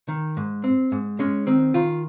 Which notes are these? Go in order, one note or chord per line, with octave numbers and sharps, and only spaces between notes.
D#3
G#2
C4
G#2
G#3 C#4
D#3 C4
D#3 F4